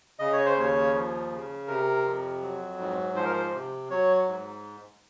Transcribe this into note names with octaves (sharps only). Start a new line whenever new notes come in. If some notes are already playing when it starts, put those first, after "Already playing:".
C#3 D#5
C#5
C5
D#2 C#5
F3
C#3
C3 A#4
F2
F#3
G#2
F3 C5
A#4
C5
C3
F#3 C#5
G#2